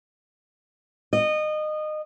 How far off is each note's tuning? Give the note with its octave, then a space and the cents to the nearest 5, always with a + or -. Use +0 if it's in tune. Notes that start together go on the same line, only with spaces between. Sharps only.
D#5 -25